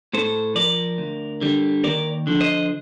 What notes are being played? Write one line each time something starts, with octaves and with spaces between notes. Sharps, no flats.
A2 A4 C5
F3 A#4 D5
D2
D3 G3
D#2 A#4 D5
D3 F3
C5 D#5